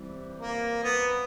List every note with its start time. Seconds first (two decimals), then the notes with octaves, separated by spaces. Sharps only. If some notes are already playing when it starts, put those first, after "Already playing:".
Already playing: E3 G3 C4
0.39 A#3
0.83 B3